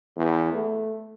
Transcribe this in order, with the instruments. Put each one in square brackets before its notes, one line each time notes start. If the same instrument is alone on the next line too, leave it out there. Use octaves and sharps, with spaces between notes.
[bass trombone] E2
A3